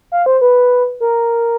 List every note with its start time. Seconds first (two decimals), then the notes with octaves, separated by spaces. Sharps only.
0.12 F5
0.26 C5
0.41 B4
1.00 A#4